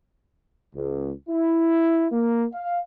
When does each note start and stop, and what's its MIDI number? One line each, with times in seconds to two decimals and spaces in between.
0.74 1.11 37
1.29 2.06 64
2.12 2.44 58
2.53 2.79 77